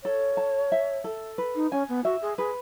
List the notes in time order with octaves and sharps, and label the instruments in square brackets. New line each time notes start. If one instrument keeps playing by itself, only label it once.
[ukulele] A4 [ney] C#5
[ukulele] A5
E5
A4
B4
[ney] D#4
[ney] C#4 [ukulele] G#5
[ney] B3
[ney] F#4 [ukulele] E5
[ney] G#4
[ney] G#4 [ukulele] B4